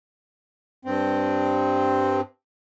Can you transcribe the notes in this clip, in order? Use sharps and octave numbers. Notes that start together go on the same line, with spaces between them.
G2 C4